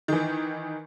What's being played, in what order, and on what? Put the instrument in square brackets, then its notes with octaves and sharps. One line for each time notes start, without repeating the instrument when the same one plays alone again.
[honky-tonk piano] D#3 E3